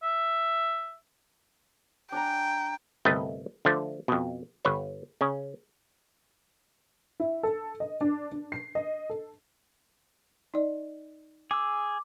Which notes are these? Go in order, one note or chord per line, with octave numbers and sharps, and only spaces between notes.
E5
D4 G5 G#5 A#5
G1 C2 A3 B4 D#5 G5
D3 F3 A3
F2 B2
G1 B4 C#5
C#3 C#4
E4
A4
D#5
D4
D4
C7
D#5
A4
D#4 D5 D#5
G#4 D6 E6